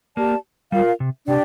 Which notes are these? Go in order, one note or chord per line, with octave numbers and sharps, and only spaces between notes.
A#3 G4 D5 A5
G3 F4 A#4 F5
C3
C3 D4 G4 D5 G5